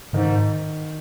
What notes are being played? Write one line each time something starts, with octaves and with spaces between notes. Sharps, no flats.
G#2 D#3